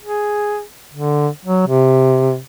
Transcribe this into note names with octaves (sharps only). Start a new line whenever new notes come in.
G#4
D3
F#3
C3